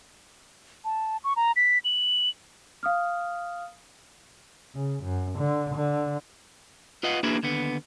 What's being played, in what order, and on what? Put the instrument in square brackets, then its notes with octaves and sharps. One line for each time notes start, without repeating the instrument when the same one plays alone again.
[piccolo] A5
C#6
A#5
B6
F#7
[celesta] F5 D#6 F6
[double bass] C#3
F#2
D3
D3
[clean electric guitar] F4 B4 D#5 F5 F#5
A#3 D4 E4 F#4 G#4 B4
D#2 D3 B3